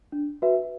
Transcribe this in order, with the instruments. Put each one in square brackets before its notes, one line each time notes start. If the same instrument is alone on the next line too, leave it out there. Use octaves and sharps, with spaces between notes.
[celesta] D4
F#4 B4 E5